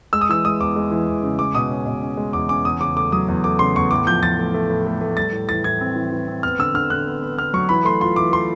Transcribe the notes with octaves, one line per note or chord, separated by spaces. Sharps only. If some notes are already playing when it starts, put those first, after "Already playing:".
G#3 E6
D#6
E3 E6
G#3 D#6
E2 D6
G#3
E3
E2
C#3
G#3 D6
B2 D#6
C#4
B2
C#4
G#3
E2 D6
C#4 D6
E2 D#6
C#3 D6
A3 D6
F#3 D#6
E2
A3 D6
C#3 C6
E2 C#6
A2 D6
F3 G6
F3 A6
A3
A3
A2
A3
A3
G3 A6
A2
E3 A6
A2 G#6
C4
E3
E3
C4
B3 F6
D3 E6
D3 F6
D3 F#6
B3
B3
B3 F6
F#3 C#6
E3 B5
A3 C6
F4 C6
E3 D6
A3 C6